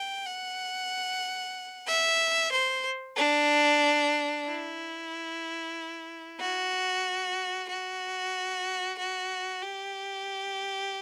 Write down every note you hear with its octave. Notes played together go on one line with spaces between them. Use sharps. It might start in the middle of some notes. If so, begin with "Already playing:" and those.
Already playing: G5
F#5
E5
C5
D4
E4
F#4
F#4
F#4
G4